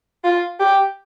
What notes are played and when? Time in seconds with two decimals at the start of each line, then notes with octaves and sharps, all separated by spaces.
0.24 F4
0.60 G4